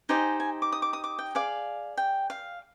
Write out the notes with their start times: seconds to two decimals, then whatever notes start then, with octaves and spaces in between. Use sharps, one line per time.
0.09 D#4 G4 C5 D#5 G#5
0.40 G#5
0.62 D6
0.72 D#6
0.82 D6
0.93 D#6
1.04 D6
1.19 G5
1.35 G#4 D5 F5
1.97 G5
2.30 F5